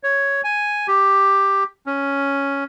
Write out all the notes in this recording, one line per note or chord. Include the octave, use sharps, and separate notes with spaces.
C#5
G#5
G4
C#4